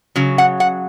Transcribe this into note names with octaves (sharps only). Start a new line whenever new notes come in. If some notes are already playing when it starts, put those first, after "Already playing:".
C#3 F#3
F#5
F#5